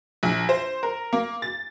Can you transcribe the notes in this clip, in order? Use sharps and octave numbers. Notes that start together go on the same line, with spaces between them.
A#1
C5
A#4
A#3
A6